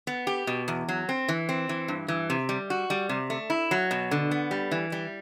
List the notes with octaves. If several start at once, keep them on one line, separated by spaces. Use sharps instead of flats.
B3
G4
B2
E2
F#3
C4
E3
C4
E3
G2
E3
C3
G3
F#4
G3
C3
A3
E4
F#3
B2
D3
B3
G3
E3
G3